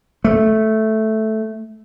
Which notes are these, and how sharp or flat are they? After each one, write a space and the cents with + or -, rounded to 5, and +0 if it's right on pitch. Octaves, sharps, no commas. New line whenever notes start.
A3 -5